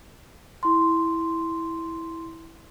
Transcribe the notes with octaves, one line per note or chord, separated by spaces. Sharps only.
E4 C6